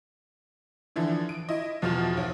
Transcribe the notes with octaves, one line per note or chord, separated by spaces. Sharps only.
D3 E3 F3
D7
E4 D#5
E2 B2 F3 F4 F6
B1